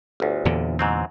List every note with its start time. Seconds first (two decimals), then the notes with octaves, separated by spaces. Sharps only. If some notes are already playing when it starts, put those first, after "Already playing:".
0.20 G1 D2
0.45 E2 A#2 D3
0.79 G#2 F#3 C4